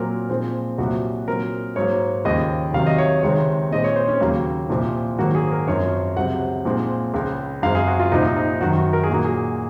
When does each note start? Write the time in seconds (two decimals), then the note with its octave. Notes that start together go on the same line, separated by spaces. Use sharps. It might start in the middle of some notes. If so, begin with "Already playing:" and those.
Already playing: A#2 F#3 C4 A#4
0.29 A#2 F3 G#3 C4
0.78 C2 A#2 F#3 F#4
1.27 A#2 F#3 C4 A#4
1.76 G#2 F#3 A#3 C#5
2.25 D#2 C#3 F3 D#5
2.74 C2 C3 D#3 F#3 F5
2.86 D#5
2.98 C#5
3.23 C#2 C3 D#3 G#3 C4 C#5
3.72 A#2 G#3 C4 D#5
3.84 C#5
3.96 C5
4.08 C#4
4.21 D#2 C#3 F#3 A#3
4.70 C2 A#2 F3
5.18 G#2 D#3 F#3 A#3 F#4
5.35 G#4
5.52 A#4
5.68 F#2 F3 C4 C#5
6.16 C#2 C3 F#3 C4 F#5
6.65 A#2 F3 G#3 C4
7.14 C#2 C#3 G#3
7.63 F#2 C#3 G#3 C4 F5
7.75 G#4
7.87 F#4
8.00 F4
8.11 C2 A#2 F3 C4 D#4
8.36 D#4
8.61 F#2 D#3 F#3 F#4
8.77 F#4
8.93 A#4
9.04 G#4
9.10 A#2 F#3 A#3 F#4
9.25 G#4